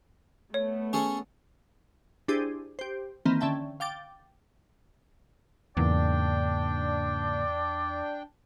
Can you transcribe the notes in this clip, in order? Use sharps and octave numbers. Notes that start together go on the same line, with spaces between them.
A3 B3 C#5
C#4 G#4 A4
D4 E4 G4 G#4 C5 D#7
G4 C5
D#3 E3 A#3 C4
D3 C#4 E5 G5 A5
F5 G5 D6 A6
E2 G#2 C#3 A#3 D4 D5 G5